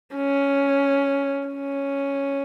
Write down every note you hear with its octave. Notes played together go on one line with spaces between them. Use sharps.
C#4
C#4